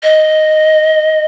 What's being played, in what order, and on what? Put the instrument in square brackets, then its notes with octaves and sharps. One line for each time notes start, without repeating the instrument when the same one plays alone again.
[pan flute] D#5